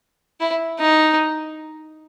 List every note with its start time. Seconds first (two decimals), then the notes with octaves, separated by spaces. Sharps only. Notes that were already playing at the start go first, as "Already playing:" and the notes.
0.40 E4
0.80 D#4